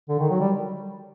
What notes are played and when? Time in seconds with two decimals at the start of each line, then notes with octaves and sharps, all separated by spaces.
0.09 D3
0.20 D#3
0.30 F#3
0.40 G3